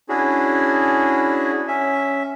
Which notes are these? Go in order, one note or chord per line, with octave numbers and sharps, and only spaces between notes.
C#4 D4 E4 F#4 G#4
C#4 E5